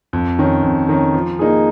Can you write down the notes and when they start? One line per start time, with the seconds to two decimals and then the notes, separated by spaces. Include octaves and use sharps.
0.13 F2
0.39 D#3 C#4
0.63 F2
0.89 D#3 C#4
1.14 F3
1.39 A#3 D#4 G#4